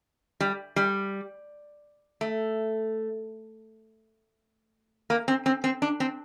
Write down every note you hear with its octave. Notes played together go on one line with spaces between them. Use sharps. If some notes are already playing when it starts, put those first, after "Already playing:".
G3
G3
A3
A#3
C4
C4
C4
D4
C4